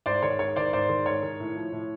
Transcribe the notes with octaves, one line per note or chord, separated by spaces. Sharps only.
G#2 C5 D5
D#3 C#5
G#2 C#5
D#3 C5 D5
G#2 C5 D5
D#3
G#2 C#5
D#3
A2
F3
A2